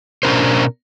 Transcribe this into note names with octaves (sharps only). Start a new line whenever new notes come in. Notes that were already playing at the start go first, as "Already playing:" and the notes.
B2 C#4 D4 A#4 C5